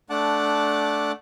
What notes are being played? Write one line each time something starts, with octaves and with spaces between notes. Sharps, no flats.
A3 D4 F#5 A5 D6